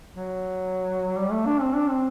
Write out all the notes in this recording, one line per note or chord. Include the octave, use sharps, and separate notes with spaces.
F#3
G3
A3
D4
C4
D4
C4